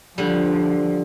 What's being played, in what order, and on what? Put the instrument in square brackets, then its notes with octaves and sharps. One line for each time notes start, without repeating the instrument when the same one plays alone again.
[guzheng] D3 G3 [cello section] F3